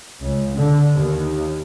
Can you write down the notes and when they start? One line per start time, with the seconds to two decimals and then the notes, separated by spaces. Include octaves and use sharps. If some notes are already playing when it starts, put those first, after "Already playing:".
0.24 C#2
0.58 D3
0.94 D#2